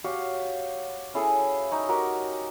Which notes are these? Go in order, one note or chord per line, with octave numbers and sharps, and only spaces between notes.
F#4 G4 C#5 F5
C#4 E4 G#4 A4
D#4 C#5
D#4 F#4 G4 A#4